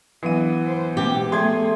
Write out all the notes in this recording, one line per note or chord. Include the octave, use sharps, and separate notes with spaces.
E3 F#3 B3 D4 F5 D#7
C5
B2 G#3 C#4 G4
F3 A3 B3 G#4 E5 C6 G#6